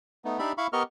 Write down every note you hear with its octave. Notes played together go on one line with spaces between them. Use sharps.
A3 B3 D#4
D4 D#4 G4 D5 E5 B5
E4 F5 B5 C#6
B3 G4 A#4 D#5 C#6 F6